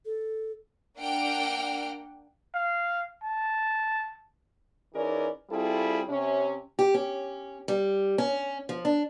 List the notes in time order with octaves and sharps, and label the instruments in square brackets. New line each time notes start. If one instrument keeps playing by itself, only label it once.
[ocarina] A4
[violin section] A#3 D4 F#5 G5 F6 D7
[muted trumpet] F5
A5
[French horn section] E3 C#4 D#4 G#4 A#4 D5
G3 C4 E4 F4 G#4 A4
C3 C#4
[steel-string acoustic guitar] G4
C#4
G3
C#4
F3
D4